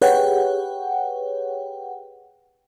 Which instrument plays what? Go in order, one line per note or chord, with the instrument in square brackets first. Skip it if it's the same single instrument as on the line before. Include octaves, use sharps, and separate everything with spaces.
[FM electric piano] G4 G#4 B4 C#5 F#5 G5